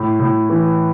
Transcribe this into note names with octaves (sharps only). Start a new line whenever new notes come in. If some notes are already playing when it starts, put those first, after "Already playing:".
Already playing: A2
A2
E3